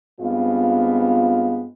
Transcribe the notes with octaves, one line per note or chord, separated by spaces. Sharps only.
G2 G#3 B3 C4 F4